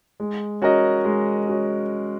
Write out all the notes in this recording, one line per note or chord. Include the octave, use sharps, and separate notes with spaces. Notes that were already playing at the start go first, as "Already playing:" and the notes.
G#3
C#4 F#4 A#4 D#5
G#3
C#4 F#4